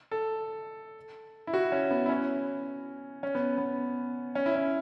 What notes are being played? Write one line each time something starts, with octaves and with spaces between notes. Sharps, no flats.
A4
E4
F#4
C#4
B3
E4
C#4
C#4
B3
B3
C#4
E4
C#4